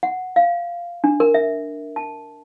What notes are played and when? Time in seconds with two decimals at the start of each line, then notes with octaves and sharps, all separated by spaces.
0.03 F#5
0.36 F5
1.04 D4
1.20 A#4
1.34 E5
1.96 A5